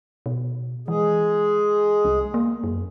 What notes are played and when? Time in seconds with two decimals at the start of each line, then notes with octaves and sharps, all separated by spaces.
0.26 B2
0.88 E3 G#3 G#4
2.05 C2
2.34 A#3
2.64 F#2